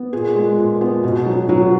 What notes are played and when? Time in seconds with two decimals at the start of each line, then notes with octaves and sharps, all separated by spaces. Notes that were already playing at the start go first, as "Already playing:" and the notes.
Already playing: B3
0.13 A#2 G#4
0.35 G#3
0.58 A#2
0.81 B3
1.04 B2
1.26 F#3
1.49 F#3